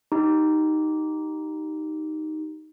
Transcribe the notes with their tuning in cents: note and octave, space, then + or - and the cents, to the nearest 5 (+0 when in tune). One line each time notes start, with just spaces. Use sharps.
D#4 +0 G4 -15